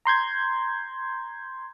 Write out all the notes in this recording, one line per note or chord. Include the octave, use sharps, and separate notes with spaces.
A#5 C6 G6 G#6